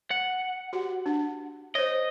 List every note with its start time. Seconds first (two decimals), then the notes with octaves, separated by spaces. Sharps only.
0.11 F#5
0.73 F#4 G4
1.06 D4
1.75 C5 C#5 D#5